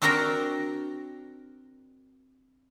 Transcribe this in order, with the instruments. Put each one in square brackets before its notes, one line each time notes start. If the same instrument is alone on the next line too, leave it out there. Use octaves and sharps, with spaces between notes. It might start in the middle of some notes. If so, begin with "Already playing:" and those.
[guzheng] C4 D4 F#4 A#4 G5 A#5